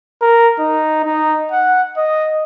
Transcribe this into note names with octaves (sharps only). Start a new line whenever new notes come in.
A#4
D#4
D#4
F#5
D#5